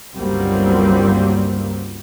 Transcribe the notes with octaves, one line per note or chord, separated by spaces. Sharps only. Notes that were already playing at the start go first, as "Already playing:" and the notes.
G1 C#2 F#3 G3 A#3 C4